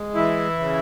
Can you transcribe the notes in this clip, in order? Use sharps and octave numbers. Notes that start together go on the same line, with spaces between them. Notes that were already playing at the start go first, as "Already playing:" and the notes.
Already playing: G#3
E3 E4
C#3